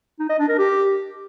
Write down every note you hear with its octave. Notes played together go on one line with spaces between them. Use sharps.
D#4
D#5
D4
A#4
G4